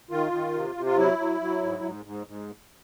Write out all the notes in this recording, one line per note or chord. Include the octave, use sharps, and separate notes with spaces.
D#3 F4
D#3
C3
C3
F4
F#3 E4
F#3
F#3
G#2
G#2
G#2
G#2